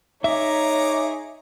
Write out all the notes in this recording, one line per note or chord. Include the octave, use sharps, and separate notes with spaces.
D#4 G#4 C#5 E5 A#5 D6